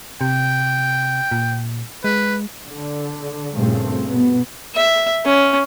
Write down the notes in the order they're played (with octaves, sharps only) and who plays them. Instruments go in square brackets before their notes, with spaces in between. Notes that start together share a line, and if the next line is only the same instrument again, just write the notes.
[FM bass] C3 [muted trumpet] G5
[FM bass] A#2
[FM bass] G#3 [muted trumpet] B4
[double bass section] D3
G2 A#2 C#3 A3 C4
B2 B3
[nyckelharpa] E5
C#4